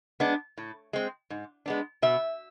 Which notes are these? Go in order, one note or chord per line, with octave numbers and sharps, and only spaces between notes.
G#3 B3 D4
A2
G#3 C4
G#2
G#3 B3 D4
B2 E5